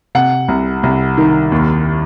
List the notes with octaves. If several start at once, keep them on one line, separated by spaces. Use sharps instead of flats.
C3 F#5
C2
C2
D#3
D#2